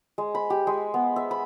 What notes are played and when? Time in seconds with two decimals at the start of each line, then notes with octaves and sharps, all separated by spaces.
0.18 G#3
0.35 B5
0.50 G4
0.67 G#3
0.94 B3
1.16 E5
1.31 B5